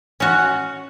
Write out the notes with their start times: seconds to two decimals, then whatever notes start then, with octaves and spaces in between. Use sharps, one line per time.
0.20 C#4 F#4